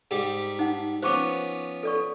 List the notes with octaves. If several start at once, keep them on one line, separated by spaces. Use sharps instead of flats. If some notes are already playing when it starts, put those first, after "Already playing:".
G#2 G3 G4
D#4 F#5
F3 B3 C#4 C5 C#6 D6
A4 D5 C#6